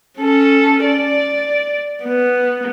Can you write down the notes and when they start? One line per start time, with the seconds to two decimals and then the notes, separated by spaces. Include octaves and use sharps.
0.19 C#4 A4
0.84 D5
2.03 B3